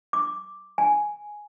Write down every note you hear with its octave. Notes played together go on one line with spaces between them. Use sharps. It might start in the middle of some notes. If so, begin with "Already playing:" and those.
D6
G#5